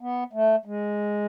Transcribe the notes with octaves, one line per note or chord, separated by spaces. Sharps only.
B3
A3
G#3